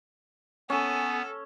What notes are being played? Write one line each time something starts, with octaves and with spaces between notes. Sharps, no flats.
B3 C#4 A4 G#5